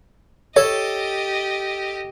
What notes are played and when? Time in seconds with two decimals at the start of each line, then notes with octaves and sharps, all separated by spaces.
0.56 G4 A4 C#5 D#5